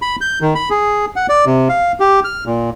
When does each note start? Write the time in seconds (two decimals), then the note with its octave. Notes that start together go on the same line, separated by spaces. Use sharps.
0.02 B5
0.21 G6
0.41 D#3
0.55 B5
0.70 G#4
1.16 F#5
1.29 D5
1.46 C3
1.69 F5
2.00 G4
2.24 F6
2.46 A#2